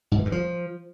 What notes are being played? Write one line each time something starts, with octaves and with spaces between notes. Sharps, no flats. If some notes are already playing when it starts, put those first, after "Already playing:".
G#2
E3
G2
F3